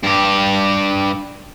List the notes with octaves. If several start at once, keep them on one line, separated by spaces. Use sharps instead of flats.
G2 G4